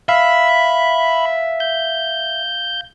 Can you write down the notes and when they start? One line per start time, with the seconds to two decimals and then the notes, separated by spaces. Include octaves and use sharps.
0.09 E5 F5 B5
1.60 G6